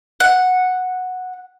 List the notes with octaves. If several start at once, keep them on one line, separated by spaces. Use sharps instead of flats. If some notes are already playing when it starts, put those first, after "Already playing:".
F#5